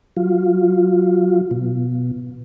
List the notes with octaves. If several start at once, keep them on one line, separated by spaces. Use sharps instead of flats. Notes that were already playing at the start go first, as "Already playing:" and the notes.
F#3 F4
B2